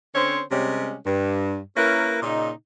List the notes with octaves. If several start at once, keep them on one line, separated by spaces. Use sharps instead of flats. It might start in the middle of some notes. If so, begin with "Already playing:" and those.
D3 C4 C#4 C5 C#5
C3 G3 G#3 C#4
G2
A#3 C#4 E4 A#4 B4
A#2 C#3 D#4